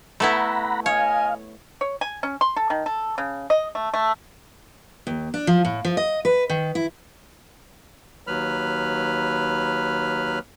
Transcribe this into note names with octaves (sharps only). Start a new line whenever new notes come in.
A3 B3 E4 F#5 A#5 B5
C#5 D#5 F5 G#5
C#5
G#5
C#4
C6
A4
D#3
A4
C#3
D#5
A3
A3
D#2
D4
F3
A2
F3
D#5
B4
D#3
E4
D#2 F#3 B4 B5 F6